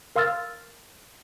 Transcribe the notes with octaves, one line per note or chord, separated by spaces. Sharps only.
A#4 F5 C6 E6 F6 A6